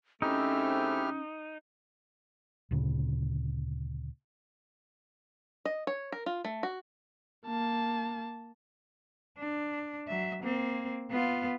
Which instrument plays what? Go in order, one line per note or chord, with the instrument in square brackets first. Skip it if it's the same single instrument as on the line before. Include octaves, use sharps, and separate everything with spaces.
[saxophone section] C#3 A3 C4 [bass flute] C#4 [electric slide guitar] D#4 [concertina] E4 G4 F6
[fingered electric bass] D2 A#2 C#3
[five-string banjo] D#5
C#5
A#4
F4
A3
F#4
[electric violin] A#3 A5
[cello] D4
F#3 E5
A#3 C4
B3 F4